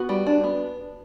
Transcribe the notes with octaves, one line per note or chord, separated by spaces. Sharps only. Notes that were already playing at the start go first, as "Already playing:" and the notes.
Already playing: B3 F#4
G3
D4
B3